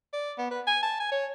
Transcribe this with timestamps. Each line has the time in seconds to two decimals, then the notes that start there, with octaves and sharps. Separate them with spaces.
0.13 D5
0.38 B3
0.51 B4
0.67 G#5
0.82 A5
1.00 G#5
1.12 C#5